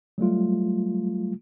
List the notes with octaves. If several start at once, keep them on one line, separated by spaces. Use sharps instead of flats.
F#3 G3 A3 F4